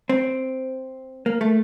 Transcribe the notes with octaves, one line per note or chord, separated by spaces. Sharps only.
C4
A#3
A3